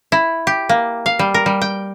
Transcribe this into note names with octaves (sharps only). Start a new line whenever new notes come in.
E4
G4
A#3
F5
G3
A#4
G3
G5